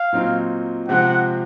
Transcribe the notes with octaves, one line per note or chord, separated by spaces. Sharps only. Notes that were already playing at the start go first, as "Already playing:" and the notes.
Already playing: F5
A#2 F#3 C4 D#4
C3 F3 G#3 C4 F#5